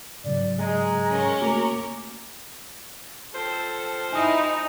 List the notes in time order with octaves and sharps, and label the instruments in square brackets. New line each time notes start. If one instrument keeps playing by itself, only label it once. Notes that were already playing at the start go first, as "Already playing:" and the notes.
[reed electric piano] G#2 C#3 F#3 [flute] D5
[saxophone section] G#3 [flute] A#5
[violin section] C#4 A#4 C#6
[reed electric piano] A3 A#3 F#4 [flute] D6
[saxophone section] F3 C4 C5 [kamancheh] A4
[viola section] D#4 [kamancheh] E4 [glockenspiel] G#5 D#6 F7